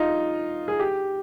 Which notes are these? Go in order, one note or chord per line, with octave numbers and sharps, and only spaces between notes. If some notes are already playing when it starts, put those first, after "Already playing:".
Already playing: D#4 F4
G#4
G4